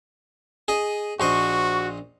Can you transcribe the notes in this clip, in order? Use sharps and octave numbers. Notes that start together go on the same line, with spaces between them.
G#4 D#5
A#1 F#4 C5 D#5 C#6